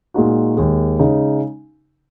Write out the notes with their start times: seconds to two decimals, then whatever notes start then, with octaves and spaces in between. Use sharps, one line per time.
0.14 A#2 G#3 D#4 F#4
0.57 D#2 D#3 G#3
0.99 C#3 G#3 D#4